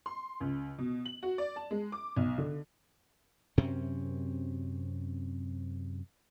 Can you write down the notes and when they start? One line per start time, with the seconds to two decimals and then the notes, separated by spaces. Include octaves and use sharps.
0.06 C6
0.40 C#2
0.78 B2
1.05 F#7
1.23 F#4
1.38 D5
1.56 A5
1.71 G#3
1.92 D6
2.17 B1
2.38 D3
3.58 F#2 C3 C4 C#4